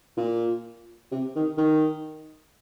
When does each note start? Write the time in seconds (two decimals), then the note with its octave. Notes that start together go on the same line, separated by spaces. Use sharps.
0.17 A#2
1.12 C3
1.36 D#3
1.58 D#3